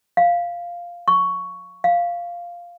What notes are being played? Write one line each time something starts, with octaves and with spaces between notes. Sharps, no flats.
F5
C#6
F5